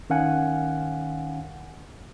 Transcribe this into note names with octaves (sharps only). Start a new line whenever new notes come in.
D#3 C#4 F5 F#5 G#5